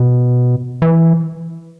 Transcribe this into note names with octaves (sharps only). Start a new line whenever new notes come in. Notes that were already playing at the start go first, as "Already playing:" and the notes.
Already playing: B2
E3